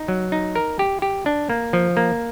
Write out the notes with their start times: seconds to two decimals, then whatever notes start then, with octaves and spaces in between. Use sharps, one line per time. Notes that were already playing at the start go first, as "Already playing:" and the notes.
Already playing: D#4
0.08 F#3
0.32 D#4
0.55 A#4
0.79 G4
1.02 G4
1.26 D4
1.50 A#3
1.73 F3
1.97 A#3